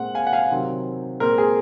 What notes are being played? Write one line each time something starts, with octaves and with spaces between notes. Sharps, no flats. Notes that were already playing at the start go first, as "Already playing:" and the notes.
Already playing: A#2 G#3 C4 F#5
F5 G#5
F#5
F5 G#5
C3 D#3 F#3 C4
A#2 G#3 C4 A#4
G#4